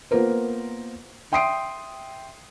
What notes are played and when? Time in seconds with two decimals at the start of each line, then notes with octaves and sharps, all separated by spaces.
0.11 A#3 B3 F4 A#4 C5
1.32 E5 G5 C6 D#6 C7 D7